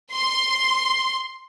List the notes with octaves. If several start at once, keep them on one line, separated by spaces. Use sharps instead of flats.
C6